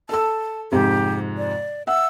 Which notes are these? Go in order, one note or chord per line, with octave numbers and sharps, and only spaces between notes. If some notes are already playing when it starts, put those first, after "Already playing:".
A4 A5 E6
F2 G#2 C3 G4
D5
E5 F#5 E6